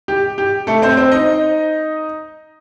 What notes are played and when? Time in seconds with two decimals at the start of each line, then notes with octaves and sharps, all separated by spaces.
0.08 G4
0.38 G4
0.67 A3 A4
0.82 C4 C5
0.97 C4 C5
1.11 D#4 D#5